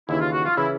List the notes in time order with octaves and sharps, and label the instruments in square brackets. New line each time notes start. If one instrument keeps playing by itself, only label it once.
[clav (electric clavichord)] D#2 C#3 E3 [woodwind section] E4
[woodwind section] F4
F#4
F4
[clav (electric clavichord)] C#3 E3 [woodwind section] E4